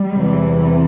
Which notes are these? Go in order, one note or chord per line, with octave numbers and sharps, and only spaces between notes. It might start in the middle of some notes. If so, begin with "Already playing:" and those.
Already playing: G3
E2 C3 E3